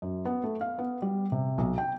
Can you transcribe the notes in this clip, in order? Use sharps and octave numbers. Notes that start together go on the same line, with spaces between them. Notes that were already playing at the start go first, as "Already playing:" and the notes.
F#2
B3
A3
F5
B3
G3
C3
B1
G5